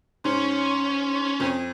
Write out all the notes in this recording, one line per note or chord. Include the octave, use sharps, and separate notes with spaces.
G#2 C#4
F2